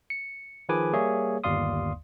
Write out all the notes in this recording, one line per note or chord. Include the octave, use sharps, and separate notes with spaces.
C#7
D#3 F3 G#4 B4 G#5 D6
G3 A#3 G#4 C#5 E5
G1 D#2 D5 F5 C6 D#6